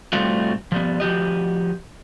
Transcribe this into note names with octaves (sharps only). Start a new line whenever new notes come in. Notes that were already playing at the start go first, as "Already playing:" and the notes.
A2 G3 A3 C4 F4 F#4
F3 G3 B3
F3 F#4 G4 D#5